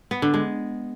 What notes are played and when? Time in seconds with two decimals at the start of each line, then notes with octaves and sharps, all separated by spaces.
0.11 B3
0.22 D3
0.34 G#3